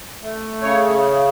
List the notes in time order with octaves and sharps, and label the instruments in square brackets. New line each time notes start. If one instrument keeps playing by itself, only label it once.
[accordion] A3
C#3 C#5